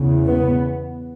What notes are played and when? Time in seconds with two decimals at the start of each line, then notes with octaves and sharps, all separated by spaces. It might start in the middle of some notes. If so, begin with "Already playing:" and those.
Already playing: E2 C#3
0.27 B3